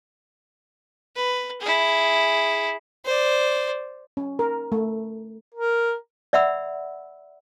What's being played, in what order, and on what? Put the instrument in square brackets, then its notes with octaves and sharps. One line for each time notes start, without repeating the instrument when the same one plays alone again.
[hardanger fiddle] B4
E4 G#4
[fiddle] C5 D5
[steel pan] C#4
A#4
A3
[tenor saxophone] A#4
[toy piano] D5 E5 F#5 B5 E6